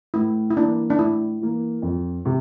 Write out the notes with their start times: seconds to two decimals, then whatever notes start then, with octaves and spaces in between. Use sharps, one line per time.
0.14 A2 E4
0.50 E4
0.56 E3 A#3 D4
0.90 D4
0.99 A2 E4
1.41 E3 A#3
1.82 F2
2.25 C3